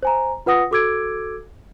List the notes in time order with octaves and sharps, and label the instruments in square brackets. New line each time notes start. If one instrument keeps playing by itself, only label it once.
[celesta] C5 G#5 A#5
F4 B4 F#5 D#6 A#6 C#7
F#4 A4 D6 E6 G#6 D7